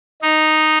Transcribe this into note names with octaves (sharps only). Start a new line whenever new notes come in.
D#4